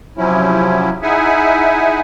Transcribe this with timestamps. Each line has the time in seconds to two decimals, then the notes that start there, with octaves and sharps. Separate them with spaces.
0.17 C3 F3 F#3 C#4 E4
1.03 D#4 E4 G#4 E5 F#5 G#5